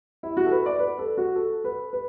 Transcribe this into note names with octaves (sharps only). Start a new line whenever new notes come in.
E4
F#4
A4
B4
D5
B4
A4
F#4
A4
B4
B4